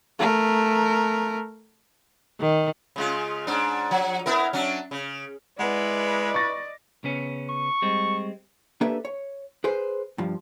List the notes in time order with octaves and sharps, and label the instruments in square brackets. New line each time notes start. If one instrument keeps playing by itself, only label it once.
[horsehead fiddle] A3 A#4
[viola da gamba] D#3
[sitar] C#3 G#3 F4
G#2 D4
F3
B3 E4 A#4
F#3 C#4 D4
C#3
[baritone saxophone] G#3 [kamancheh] E4 B4 [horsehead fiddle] D5 D#5 [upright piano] F#5
[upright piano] C#6 A6 A#6
[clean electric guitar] C#3 B3 C#4
[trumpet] C#6
[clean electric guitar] G3 G#3 C4
[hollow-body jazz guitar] A#3 D4 G4 A4 B4 E5
C#5
G#4 B4 C5
G2 F3